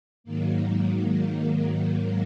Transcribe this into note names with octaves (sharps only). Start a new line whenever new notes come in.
G#2 D#3 F#3 A#3
A#3